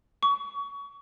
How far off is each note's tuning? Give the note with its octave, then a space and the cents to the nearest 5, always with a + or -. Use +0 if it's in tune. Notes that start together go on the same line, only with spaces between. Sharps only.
C#6 +25